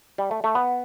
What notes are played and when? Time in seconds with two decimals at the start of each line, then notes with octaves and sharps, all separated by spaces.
0.18 G3
0.31 A3
0.44 A3
0.55 B3